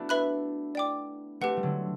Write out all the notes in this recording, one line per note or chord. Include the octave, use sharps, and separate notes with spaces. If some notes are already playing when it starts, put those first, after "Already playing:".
Already playing: A3 B3 D4 E4 F#4
B4 E5 B5 F#6
D5 G5 D6
A3 C4 G4 B4 F#5
G3
D3 F#3